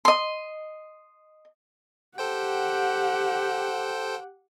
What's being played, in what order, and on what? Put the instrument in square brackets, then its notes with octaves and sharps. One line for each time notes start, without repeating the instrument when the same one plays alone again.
[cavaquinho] D#5 C6
[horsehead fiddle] G4 F#5 [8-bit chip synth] A4 C5 G5